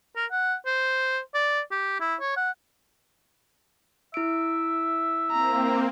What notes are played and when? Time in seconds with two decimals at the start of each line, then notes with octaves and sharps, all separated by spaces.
0.16 A#4
0.32 F#5
0.66 C5
1.35 D5
1.72 G4
2.01 E4
2.21 C#5
2.37 F#5
4.14 E4 E5 D7
5.31 A#3 C4 A#5